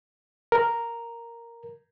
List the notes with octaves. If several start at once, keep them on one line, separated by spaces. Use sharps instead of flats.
A#4